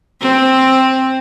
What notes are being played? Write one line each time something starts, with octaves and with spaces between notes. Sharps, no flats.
C4